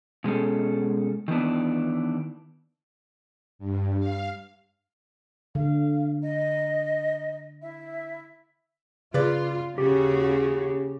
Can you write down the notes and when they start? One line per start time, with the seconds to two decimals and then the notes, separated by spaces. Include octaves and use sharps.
0.24 B2 G#3 C#4 A4
1.28 D#3 E3 B3 D4
3.59 G2
3.99 F5
5.55 D3 F5
6.21 D#5
7.62 E4 E5
9.14 C#3 F4 B4 D5
9.78 D#2 C#3 F#4 G4